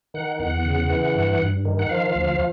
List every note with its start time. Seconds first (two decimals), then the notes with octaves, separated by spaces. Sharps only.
0.14 D#3 F#5
0.39 E2 F#5
0.64 C#3
0.90 E3
1.15 G2
1.40 G2
1.65 D#3
1.79 F#5
1.89 F3 F5
2.15 D2